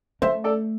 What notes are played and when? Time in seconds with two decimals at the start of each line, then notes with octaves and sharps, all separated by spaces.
0.22 A3 C5 E5
0.44 A4 D5